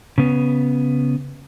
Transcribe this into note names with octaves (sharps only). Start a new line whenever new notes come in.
C#3 B3